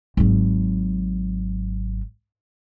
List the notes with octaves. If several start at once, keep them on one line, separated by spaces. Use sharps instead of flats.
G#1 F#3